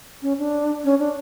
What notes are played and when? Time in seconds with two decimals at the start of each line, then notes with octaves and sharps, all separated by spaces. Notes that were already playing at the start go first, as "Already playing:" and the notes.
0.22 C#4
0.38 D4
0.84 C#4
0.99 D4